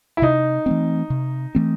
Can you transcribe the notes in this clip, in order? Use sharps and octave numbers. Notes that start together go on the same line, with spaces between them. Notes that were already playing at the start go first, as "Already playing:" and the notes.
E4
C3 D#4
E3 A3 C4
C3
E3 A3 C4